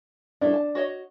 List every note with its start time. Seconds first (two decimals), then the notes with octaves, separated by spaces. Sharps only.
0.41 G3 A3 D4 E4
0.54 A5
0.75 F#4 C#5 D#5